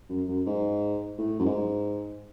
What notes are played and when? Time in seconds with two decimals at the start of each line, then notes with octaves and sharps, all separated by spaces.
0.10 F#2
0.28 F#2
0.46 G#2
1.18 A2
1.40 F#2
1.46 G#2